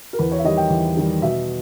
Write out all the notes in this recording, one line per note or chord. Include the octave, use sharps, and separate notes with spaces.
A#4
E2 B4
C#5
E5
D#3 G3 D#5
G5
E2
D#3 G3
B2 E5